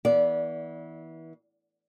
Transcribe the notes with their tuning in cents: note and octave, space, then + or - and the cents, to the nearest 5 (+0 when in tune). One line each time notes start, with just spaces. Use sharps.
E3 -30 B3 -25 D5 -15